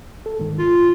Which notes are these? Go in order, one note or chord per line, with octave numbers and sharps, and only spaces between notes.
A4
G#2 D#3
F4